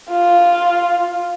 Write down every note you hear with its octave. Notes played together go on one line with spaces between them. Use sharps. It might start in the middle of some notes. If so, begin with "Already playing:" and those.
F4